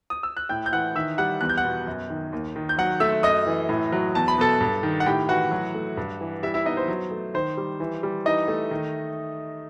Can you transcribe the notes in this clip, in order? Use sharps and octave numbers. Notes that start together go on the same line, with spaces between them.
D#6
E6
F#6
A2 G5 G6
G6
E3 F#5 F#6
D#3 E5 E6
G3 F#5 F#6
E2 F#6
G6
F#5 F#6
B2
F#2
D#3
D#2
D#3
G6
F#3 F#5 F#6
A3 E5 E6
F#2 D#5 D#6
E3
A2
F#3
E2 A5
B5
B2 A4 A5
G2
D#3
F#5
A2 G4 G5
E3 F#4 F#5
F#3
A3
G2
E3
G3 E4 E5
E4 E5
B3 D#4 D#5
C5
F#3
A3
D#3 C5
G3
E3
G3
E3 D#4 D#5
A3
D#3